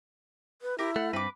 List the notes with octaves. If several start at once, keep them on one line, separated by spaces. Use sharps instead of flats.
B4
E4 G4 A#4
A3 F#5
G2 C4 B4 D6